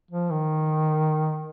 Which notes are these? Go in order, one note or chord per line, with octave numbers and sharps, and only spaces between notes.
F3
D#3